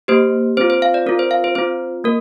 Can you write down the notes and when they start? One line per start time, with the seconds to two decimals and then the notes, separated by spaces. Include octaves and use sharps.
0.08 A#3 G4 C5
0.57 C4 F4 C5
0.70 C5
0.82 F5
0.94 D5
1.06 C4 F4 A#4
1.19 C5
1.31 F5
1.44 C5
1.55 C4 F4 C5
2.04 A#3 A#4